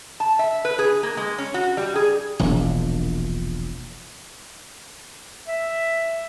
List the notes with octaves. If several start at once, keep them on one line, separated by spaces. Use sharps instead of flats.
A5
E5
B4
G#4
A#3
G#3
C#4
F#4
G3
G#4
E1 A#1
E5